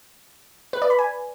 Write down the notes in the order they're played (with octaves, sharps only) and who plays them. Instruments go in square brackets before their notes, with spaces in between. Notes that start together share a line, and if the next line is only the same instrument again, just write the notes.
[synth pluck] B4
D5
B5
G#5